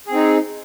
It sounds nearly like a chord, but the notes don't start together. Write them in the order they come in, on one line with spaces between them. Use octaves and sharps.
G#4 C4 D#4